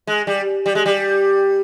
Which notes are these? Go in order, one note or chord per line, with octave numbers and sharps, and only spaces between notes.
G#3
G3
G3
G#3
G3